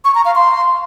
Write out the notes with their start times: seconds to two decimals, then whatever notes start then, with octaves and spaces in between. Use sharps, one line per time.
0.05 C#6
0.15 A#5
0.25 F5
0.35 C6